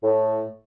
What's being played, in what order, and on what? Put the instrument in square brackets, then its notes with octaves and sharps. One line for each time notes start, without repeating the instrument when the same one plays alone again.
[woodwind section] A2